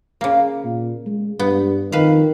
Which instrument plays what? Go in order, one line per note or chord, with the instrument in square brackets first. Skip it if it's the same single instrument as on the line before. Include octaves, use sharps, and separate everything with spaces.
[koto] C#3 A#3
[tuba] A#2
G#3
[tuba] G2 [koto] B3
[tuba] F2 [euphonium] D#3 [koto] B4 F5